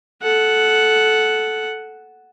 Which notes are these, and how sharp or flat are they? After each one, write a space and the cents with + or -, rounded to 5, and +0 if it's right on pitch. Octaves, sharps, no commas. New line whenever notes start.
A4 -15 F#5 +0